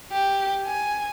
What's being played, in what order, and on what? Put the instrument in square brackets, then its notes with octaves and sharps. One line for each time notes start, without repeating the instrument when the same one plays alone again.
[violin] G4
G#5